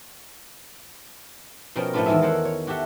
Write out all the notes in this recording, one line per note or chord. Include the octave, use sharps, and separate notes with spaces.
B2 F3 C#4 A#4 G5
A2 F3 A3 B3 D4 F4
E2 D#3 G#3 G#4 E5
A4 A#4 C5 C#5 F#5
C#5
F#4 G4 A4 E5 F#5